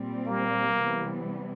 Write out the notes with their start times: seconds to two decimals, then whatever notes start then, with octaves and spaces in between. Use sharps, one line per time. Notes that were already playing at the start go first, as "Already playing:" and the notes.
Already playing: A#2 G3 C4
0.26 A#3
0.76 C3 E3 G3 B3